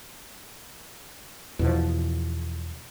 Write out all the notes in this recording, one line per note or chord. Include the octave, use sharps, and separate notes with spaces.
E2 B2 F3